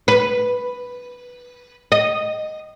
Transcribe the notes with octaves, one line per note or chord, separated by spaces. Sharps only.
B4
D#5